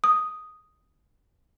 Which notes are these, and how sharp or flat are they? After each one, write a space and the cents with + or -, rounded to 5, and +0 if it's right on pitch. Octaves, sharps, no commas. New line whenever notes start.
D#6 +0